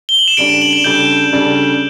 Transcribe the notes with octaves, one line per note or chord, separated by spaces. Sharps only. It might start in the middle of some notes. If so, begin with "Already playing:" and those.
G7
F#7
E7
C#3 G3 D4 A4 D7
E7
F#7
E7
C#3 G3 D4 A4 G6
C#3 G3 D4 A4